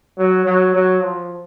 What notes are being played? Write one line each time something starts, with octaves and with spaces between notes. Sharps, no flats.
F#3
F#3
F#3
F3